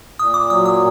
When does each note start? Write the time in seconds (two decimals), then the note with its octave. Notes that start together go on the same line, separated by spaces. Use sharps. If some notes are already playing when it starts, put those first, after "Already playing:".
0.19 A#2 D#6
0.34 D6
0.50 F#3 D#6
0.65 D#6